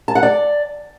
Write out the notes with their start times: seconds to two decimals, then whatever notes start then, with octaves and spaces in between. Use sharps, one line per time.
0.08 A5
0.15 F#5
0.23 D5